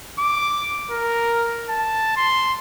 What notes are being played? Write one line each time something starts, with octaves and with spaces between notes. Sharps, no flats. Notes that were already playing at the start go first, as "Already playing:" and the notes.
D6
A#4
A5
C6